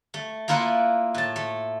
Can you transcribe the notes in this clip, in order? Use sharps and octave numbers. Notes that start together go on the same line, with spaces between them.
A3
A#3 E4 F4 A#4 B4 F#5
A2 A5
A3